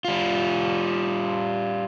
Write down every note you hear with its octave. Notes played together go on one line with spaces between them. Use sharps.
G3 F4